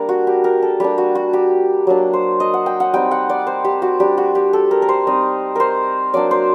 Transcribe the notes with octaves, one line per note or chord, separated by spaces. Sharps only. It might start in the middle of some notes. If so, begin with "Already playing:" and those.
Already playing: G3 A#3 D4 A#4
F#4
G4
A#4
A4
G3 A#3 D4 G4
F#4
F#4
G4
F#3 A#3 D4
C5
D#5
F#5
G5
F#5
G3 C4 D#4 G5
F#5
D5
C5
G4
F#4
G3 D4 G4
F#4
G4
A4
A#4
A#4
C5
G3 C4 D#4 D#5
A#4 C5
F#3 A#3 D4 D5
C5